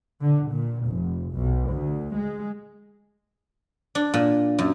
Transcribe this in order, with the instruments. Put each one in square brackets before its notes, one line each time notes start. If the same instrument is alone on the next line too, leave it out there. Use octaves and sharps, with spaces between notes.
[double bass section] D3
A#2
F1
B1
D2
G#3
[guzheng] D4
A#2
F#2